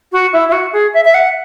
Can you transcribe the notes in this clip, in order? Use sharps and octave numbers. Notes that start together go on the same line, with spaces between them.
F#4
E4
E4
F#4
G#4
E5
E5
F#5